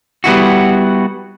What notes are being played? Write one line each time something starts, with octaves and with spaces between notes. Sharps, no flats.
G3 B3 E4 F#4